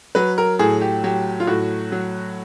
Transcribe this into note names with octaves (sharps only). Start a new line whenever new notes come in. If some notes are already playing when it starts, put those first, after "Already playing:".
F#3 B4
A#4
A2 G#4
G4
F#3 G4
F4
A2 F#4
F#3